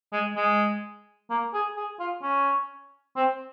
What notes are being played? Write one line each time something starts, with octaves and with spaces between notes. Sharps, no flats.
G#3
G#3
A#3
G#4
G#4
F4
C#4
C4